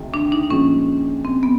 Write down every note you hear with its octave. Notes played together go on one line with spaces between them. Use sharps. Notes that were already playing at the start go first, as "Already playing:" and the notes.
Already playing: D2 C3 D#3 G#3
D4
D#4
A#2 F3 G#3 C#4
C4
B3